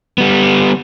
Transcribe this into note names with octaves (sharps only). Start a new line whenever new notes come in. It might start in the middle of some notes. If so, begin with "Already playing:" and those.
G3 B3